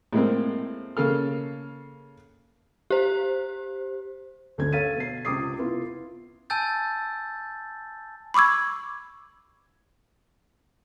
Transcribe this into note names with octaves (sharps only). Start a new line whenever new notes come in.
A2 G#3 A#3 C4
C#3 A#3 A4 F6
G4 C5
D2 D3 C#4 G#6
A4 C#5 F5 A6 B6 D#7
B2 C7
C#2 C3 C4 D6 D#6 C7
B3 E4 F4 B4
G#5 A5 E6 G6 A6
B5 C#6 D6 E6 G#6